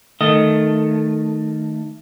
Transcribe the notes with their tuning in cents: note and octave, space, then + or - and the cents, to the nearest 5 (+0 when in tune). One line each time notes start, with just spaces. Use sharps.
D#3 +0 A3 +0 D#5 +0